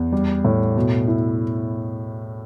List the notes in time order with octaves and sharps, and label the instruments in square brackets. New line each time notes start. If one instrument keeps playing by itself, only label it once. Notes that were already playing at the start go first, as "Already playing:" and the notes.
Already playing: [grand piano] E2
G3
A2
B2
E4